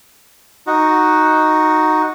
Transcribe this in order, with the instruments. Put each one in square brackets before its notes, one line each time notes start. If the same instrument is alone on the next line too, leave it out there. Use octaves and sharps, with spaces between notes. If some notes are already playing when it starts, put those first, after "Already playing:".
[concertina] D#4 F#4